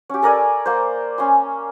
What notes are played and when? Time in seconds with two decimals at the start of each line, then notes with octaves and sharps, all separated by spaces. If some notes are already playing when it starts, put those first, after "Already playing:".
0.09 C#4 G4
0.22 A4 A#4 D5 G#5
0.66 A#3 C5
1.18 C#4 G#5 C6